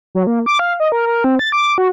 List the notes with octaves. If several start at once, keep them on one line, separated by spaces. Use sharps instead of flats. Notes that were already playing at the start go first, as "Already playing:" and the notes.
F#3
A#3
D6
F5
D#5
A#4
A#4
C4
A6
D6
F#4